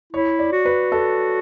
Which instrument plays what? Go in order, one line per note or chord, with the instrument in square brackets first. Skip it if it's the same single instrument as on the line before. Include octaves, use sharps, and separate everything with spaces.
[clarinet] E4 [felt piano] C#5
[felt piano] D5
[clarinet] F#4
[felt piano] B4
A4